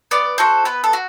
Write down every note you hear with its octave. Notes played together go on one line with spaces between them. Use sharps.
B3 D5
F#4 A4 C5
B3 B4
A4
F#4